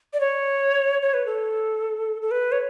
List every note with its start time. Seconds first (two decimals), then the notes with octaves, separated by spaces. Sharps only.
0.13 D5
0.20 C#5
1.02 C#5
1.14 B4
1.26 A4
2.22 A4
2.31 B4
2.52 C#5